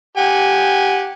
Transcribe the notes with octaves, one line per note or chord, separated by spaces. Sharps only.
G4 F#5 G#5